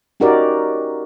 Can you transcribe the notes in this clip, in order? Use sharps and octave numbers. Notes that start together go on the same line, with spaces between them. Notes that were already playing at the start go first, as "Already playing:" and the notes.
C#4 D#4 F#4 G4 A#4 D5